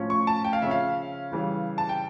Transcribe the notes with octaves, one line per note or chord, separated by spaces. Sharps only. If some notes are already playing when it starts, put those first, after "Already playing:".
Already playing: A2 F3 C#4
C#6
A5
G5
F5
C#3 F3 C#4 E5
F5
C#3 E3 G3
A5
G5